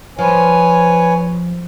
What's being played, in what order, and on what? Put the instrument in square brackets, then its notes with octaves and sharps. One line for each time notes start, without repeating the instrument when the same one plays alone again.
[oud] F3 [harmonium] B4 C#5 G#5